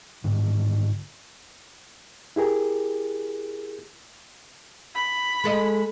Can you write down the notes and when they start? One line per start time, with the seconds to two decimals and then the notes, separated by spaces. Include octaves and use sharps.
0.24 G#2 D3 D#3
2.36 E4 G4 G#4 A#4
4.95 B5
5.44 G#3 A4 D#5